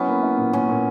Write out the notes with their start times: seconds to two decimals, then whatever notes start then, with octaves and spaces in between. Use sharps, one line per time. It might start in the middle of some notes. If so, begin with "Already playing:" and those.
Already playing: F#3 B3 C#4 E4
0.08 A#3
0.23 E4
0.38 A#2
0.53 A#2 C#4
0.69 A#2